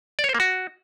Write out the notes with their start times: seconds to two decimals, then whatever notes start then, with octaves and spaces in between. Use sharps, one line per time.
0.19 D5
0.24 C#5
0.29 C5
0.34 A#3
0.40 F#4